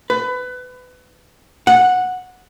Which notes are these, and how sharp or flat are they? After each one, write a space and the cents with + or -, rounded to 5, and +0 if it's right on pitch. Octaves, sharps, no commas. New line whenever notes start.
B4 +25
F#5 -10